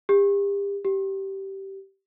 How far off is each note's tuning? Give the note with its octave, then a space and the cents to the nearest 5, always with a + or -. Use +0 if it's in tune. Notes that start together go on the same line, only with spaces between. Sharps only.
G4 +35
G4 -15